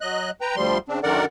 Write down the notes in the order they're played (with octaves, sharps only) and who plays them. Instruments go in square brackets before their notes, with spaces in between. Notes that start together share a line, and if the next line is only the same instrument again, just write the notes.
[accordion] F#3 D#5 F#6
B4 G5 A#5
D2 F3 G3 C6
C#3 C4 D4
F#2 D3 D#3 A#4 D5 F#5